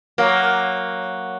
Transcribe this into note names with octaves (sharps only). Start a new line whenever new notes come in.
F#3 A#3